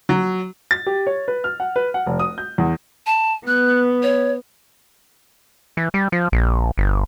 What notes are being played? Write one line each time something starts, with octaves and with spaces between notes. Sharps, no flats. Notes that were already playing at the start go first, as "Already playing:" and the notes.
F#3
A6
G4
C#5
B4
F6
F#5
B4
F#5
F1
D#6
G6
E2
A5
B3 F#6
C#5
E3
G3
F3
A#1
G1